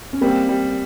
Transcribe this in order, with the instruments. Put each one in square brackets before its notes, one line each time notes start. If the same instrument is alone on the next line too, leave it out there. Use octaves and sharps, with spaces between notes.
[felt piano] C#4
[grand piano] G3 [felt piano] A#3 C4
[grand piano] G3